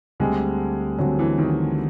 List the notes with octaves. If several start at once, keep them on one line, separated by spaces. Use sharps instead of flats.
D2 D3 G3 G#3 C4
D2 D3 F#3 G3 C4
E3
D#3